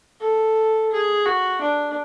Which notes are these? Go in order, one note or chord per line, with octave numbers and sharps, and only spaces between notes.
A4
G#4
F#4
D4